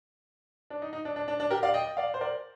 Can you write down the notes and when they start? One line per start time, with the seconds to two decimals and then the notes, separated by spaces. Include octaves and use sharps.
0.70 D4
0.82 D#4
0.93 D#4
1.05 D4
1.16 D4
1.28 D4
1.40 D4
1.50 G4 A#4
1.63 D5 F5
1.74 D#5 G5
1.97 D5 F5
2.14 C5
2.21 A#4 D5